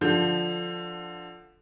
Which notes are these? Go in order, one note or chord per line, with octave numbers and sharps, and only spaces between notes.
D3 F3 G6